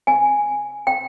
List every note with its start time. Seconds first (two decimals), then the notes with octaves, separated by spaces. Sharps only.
0.07 G#5
0.87 G5